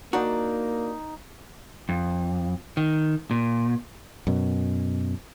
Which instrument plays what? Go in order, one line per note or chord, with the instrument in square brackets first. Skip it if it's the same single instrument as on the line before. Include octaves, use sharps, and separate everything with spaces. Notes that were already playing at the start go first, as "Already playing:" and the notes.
[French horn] A#3 [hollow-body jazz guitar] D4 F#4 [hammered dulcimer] D#4
[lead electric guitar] F2
D#3
A#2
[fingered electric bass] F#2 B2